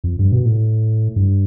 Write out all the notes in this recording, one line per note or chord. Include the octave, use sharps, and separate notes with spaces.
F2
G2
B2
A2
G2